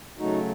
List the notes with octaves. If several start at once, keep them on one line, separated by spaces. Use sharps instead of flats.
C#3 F#3 A3 D#4 F#4